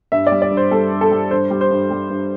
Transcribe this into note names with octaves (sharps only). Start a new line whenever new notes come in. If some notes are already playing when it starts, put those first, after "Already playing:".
G2 E5
D5
G3
D5
G2
C5
G3 A4
G2
A4
G3
G2 C5
G3
C5
G2
G3
G2